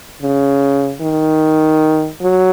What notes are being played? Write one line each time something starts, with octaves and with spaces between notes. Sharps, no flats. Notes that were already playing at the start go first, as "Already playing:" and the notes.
C#3
D#3
F#3